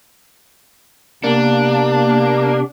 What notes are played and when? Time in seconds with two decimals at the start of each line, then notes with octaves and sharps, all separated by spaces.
1.24 C3 A#3 B3 D4 G4